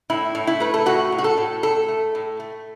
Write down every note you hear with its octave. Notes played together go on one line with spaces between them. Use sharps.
A2 E4
A2
E4
A3 B4
A4
A2 F#4
A2
F#4
A4
A2
A2 A4
A3
A2
A3